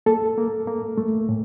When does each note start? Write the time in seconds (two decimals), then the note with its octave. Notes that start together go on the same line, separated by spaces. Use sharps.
0.06 A#3 A4
0.37 A#3
0.67 A#3
0.98 A3
1.29 A2